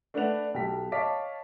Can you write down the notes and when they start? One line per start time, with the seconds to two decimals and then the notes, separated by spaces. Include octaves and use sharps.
0.14 A3 D4 B4 F#5 F7
0.54 B1 G4 B6
0.92 C#5 D#5 F5 A5 D6 B6